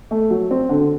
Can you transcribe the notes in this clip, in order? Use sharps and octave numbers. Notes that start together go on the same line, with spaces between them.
A3
F#3
C4
D3